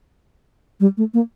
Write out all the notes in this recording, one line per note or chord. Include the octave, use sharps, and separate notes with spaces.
G3
A3
A#3